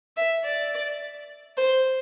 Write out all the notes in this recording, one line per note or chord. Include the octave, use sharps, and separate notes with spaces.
E5
D5
C5